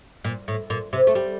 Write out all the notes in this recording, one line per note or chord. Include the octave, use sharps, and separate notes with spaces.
A#2
A2
A#2
C3
A3
G3